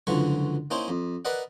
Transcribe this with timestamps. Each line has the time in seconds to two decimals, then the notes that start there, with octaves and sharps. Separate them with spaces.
0.07 C#2 F#2 D3 E3 F3 C#6
0.71 A#3 C#4 D#4 E4 C5
0.88 F2
1.25 A#4 B4 D5 D#5 F#5